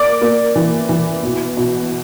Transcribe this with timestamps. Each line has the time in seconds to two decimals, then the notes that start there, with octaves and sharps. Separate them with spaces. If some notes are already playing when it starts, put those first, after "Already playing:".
Already playing: A#3 D5 D6
0.21 A#3
0.56 E3
0.89 E3
1.23 B2
1.57 B2